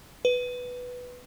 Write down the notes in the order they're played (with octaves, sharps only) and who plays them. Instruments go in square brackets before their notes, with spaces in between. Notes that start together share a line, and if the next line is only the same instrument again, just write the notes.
[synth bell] B4